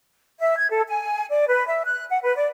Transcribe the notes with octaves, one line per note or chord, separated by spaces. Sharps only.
E5
G#6
A4
G#5
D5
B4
E5
F#6
F#5
B4
D5